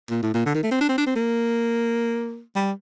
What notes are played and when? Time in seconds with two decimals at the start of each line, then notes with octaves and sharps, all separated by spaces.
0.10 A#2
0.23 A2
0.34 A#2
0.46 D3
0.54 D#3
0.63 A3
0.71 C4
0.81 D4
0.89 C4
0.98 D4
1.07 C4
1.16 A#3
2.56 G3